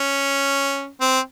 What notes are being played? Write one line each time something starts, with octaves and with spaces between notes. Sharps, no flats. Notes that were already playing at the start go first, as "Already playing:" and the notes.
Already playing: C#4
C4